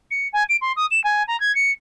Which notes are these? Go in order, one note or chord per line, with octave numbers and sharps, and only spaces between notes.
C#7
G#5
D7
C6
D#6
E7
G#5
A#5
G#6
C#7